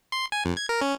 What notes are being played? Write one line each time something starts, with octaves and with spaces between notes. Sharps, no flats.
C6
G#5
F2
G#6
A#4
C#4